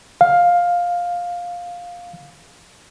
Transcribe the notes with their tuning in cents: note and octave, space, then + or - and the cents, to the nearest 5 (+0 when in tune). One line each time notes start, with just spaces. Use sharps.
F5 +10